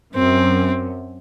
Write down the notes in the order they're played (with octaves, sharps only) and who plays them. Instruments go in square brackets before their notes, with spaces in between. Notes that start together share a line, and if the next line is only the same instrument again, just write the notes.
[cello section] F#2 [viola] C4